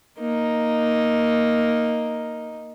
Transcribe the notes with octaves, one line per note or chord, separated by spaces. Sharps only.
A#3 D#4